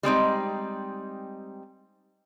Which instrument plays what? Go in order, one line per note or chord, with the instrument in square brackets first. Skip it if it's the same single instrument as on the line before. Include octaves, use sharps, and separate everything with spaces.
[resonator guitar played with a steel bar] G3 G#3 C4 D#4